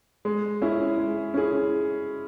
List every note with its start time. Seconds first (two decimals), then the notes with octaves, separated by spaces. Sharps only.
0.25 G#3
0.62 C#4 E4 G#4
0.98 G#3
1.34 C#4 E4 G#4